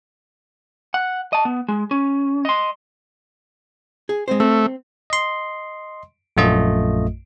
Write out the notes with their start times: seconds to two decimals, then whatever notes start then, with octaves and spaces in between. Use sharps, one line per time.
0.94 F#5
1.33 D#5 A5
1.45 B3
1.68 G#3
1.91 C#4
2.45 D#5 C6
4.09 G#4
4.28 G#3 C4 C5
4.40 A3 C4
5.10 D#5 C6
6.37 A#1 F#2 A3 F4 D#5